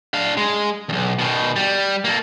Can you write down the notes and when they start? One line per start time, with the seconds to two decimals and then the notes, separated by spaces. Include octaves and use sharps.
0.14 D4 F5
0.37 G#3
0.89 B1 E2
1.19 B2 D#3
1.56 G3
2.05 A#3 A4